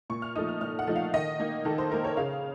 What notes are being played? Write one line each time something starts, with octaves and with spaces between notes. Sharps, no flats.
A#2 C#6
F6
F3 A3 D#4 D#6
F6
A#2 F6
F#5
F3 A3 D#4
F5
D#3 D#5
A#3 D#4
D#3 A4
C5
A#3 D#4 A#4
C#5
C#3 F5